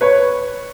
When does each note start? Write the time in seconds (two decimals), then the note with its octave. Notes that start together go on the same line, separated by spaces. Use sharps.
0.01 B4 C#5